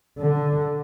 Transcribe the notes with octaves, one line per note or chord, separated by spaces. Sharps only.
D3